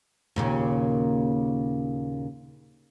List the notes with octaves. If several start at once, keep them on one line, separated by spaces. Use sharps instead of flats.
D#2 A#2 C#3